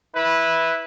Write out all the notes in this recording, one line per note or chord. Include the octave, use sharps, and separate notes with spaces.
E4 B4